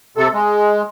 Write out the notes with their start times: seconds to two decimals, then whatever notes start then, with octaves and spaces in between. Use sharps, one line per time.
0.17 C3 A4
0.34 G#3